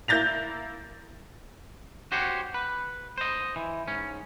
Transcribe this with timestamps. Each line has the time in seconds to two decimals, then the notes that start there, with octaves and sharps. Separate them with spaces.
0.08 A#3 E4 G6 A6 A#6 F7
2.12 F#4 G4 C5 C#5
2.54 B4
3.18 C5 D#5
3.56 E3
3.87 G#2 C#4